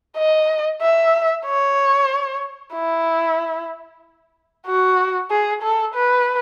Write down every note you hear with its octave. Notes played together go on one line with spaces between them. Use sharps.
D#5
E5
C#5
E4
F#4
G#4
A4
B4